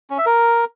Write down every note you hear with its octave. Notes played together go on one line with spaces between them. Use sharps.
C#4
E5
A#4